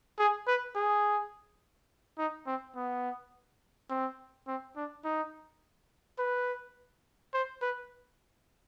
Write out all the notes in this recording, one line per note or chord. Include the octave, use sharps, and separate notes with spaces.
G#4
B4
G#4
D#4
C4
B3
C4
C4
D4
D#4
B4
C5
B4